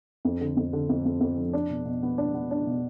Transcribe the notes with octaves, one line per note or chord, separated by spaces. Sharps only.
F2
D3
F2
D3
F2
F2
F2
F3
D4
B2
B2
B3
D4
B3
D4
B2